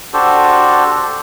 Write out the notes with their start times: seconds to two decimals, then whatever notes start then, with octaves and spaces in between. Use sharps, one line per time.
0.14 D4 F#4 G4 A4 C5